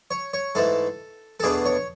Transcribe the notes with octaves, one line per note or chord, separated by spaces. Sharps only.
C#5
C#5
G#2 E3 A3 A4
A4
E2 B2 A3 D4 G#4
C#5